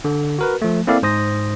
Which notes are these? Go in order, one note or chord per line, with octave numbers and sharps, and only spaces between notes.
D3
F#4 A#4 B4
F3 A3
A#3 C4 E4 A4 D5 F5
G#2 C5 D#6 A#6